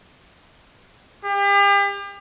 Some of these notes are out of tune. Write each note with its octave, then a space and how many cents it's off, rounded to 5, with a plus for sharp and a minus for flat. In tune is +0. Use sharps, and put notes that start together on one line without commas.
G4 +40